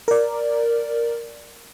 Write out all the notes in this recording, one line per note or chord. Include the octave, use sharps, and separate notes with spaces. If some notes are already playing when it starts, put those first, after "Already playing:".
A#4 D5